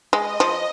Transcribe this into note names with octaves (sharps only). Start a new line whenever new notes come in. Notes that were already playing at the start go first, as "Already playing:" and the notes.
G#3 D#5
F3